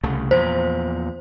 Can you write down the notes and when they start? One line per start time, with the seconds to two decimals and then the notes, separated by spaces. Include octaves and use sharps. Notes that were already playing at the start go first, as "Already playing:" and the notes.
0.04 C2 C#3 A3
0.31 E2 A#2 F3 C5